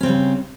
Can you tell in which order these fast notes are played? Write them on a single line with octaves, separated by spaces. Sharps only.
C#4 C4 C#3 G3